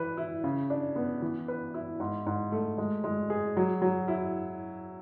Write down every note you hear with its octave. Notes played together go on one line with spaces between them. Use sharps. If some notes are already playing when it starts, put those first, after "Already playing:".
Already playing: E3 B4
E4
C#3
D4
B3
E3
B4
E4
G#2
G#2
A3
G#3
G#3
G#4
F#3
F#3
E4